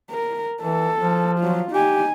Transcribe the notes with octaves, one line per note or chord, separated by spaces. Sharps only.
A#4
E3 A4
F3
F#3 F4
D#4 G4 G#5